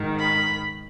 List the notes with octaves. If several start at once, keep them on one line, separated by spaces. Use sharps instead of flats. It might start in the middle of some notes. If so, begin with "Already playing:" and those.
Already playing: G#2 D#3
B5